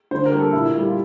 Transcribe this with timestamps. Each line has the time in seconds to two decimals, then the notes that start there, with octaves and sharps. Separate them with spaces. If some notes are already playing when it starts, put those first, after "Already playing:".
0.11 D3 C5
0.26 A#4
0.32 G3 A#3 G4
0.39 A4
0.53 A#2 E4
0.74 G3 A#3
0.87 F4